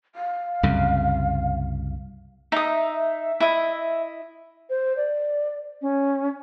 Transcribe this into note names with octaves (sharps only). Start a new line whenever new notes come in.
F5
C2 F#2 C#3
D#4 E5 D#6
E4 D#5
C5
D5
C#4